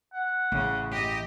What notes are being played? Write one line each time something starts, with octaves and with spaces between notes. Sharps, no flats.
F#5
A1 C#3
G4 D#5